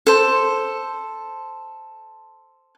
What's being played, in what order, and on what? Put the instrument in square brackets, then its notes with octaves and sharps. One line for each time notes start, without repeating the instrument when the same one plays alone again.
[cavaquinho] A4 C5